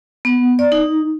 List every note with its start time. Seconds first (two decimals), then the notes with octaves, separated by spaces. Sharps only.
0.25 B3
0.59 D5
0.72 D#4